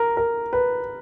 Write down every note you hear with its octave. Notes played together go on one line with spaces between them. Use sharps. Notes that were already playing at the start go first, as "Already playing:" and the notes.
Already playing: A#4
A#4
B4